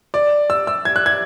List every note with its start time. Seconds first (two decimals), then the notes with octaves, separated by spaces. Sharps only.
0.14 D5
0.50 E6
0.67 E6
0.85 G#6
0.96 F#6
1.06 G#6